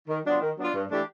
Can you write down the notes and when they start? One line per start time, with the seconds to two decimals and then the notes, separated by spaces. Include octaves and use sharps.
0.08 D#3
0.25 F#3 B3 D4 F4
0.41 D#3
0.57 F#3 B3 D4 F4
0.74 G2
0.90 E3 A3 D4 G4